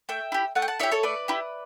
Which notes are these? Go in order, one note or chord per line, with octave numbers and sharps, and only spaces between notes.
A3 E5 G5
E4 G4
A3 F#5 A5
G5
F#5 A5
E4 G4 C#5 E5
A4 C#5
A3 B4 D5
E4 G4